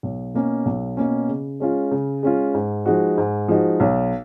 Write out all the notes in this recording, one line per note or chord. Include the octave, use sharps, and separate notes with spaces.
B1
B2 A#3 C#4
B1
B2 A#3 C#4
C#3
G#3 C#4 F4
C#3
G#3 C#4 F4
G#2
F3 G#3 D#4 F#4
G#2
F3 G#3 D#4 F#4
B1